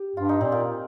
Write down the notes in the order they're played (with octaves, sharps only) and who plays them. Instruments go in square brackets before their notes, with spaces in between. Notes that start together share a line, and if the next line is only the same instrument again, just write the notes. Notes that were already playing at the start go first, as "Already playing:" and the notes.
Already playing: [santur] G4
[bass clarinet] G2 [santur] F4
[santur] D#4
[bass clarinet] A#2 [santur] C4
[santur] A#3